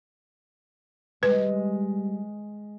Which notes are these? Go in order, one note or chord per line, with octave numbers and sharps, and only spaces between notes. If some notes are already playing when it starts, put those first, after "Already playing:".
G3 G#3 B4